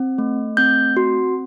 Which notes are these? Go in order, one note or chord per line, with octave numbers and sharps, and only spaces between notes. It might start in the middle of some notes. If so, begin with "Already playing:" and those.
Already playing: C4
A3
C4 G6
F#4